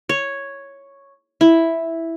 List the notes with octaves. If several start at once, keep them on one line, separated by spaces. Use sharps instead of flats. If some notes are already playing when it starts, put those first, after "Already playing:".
C#5
E4